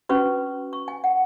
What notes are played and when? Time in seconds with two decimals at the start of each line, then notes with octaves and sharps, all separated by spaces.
0.09 C#4 F#4 B4 C#6
0.73 C#6
0.88 G#5
1.04 F#5